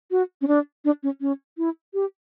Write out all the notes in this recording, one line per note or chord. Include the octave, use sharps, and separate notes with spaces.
F#4
C#4
D4
D4
C#4
C#4
E4
G4